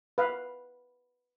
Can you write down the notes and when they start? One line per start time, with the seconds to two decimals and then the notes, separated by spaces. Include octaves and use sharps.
0.18 B4 F5